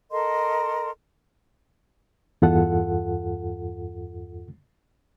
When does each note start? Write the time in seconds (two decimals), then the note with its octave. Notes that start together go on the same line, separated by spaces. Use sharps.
0.11 A4 A#4 D#5 C6
2.42 E2 G2 F4 A4 F#5